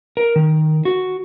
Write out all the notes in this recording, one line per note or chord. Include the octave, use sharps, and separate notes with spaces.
A#4
D#3
F#4